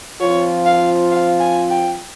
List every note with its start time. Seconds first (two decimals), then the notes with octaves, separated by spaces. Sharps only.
0.21 F3 C4 F4 C#5
0.66 F5
1.11 F5
1.40 G#5
1.70 G5